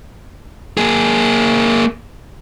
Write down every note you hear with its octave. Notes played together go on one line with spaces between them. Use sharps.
A#3 G#4